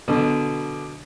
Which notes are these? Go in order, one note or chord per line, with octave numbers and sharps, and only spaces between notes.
B2 D3 F#3